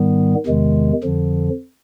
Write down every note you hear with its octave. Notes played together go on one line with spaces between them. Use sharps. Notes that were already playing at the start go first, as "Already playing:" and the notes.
Already playing: G#2 D#3 G3 B3
E2 C3 D#3 G#3
F2 D3 F3